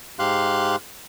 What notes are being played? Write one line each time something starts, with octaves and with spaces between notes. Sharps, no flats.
G#2 G4 F5 C6 F#6